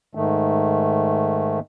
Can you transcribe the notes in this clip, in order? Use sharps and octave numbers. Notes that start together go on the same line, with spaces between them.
G#2 D#3 A3